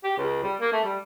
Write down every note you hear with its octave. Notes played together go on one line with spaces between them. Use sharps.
G4
C#2
G3
A#3
A3
G3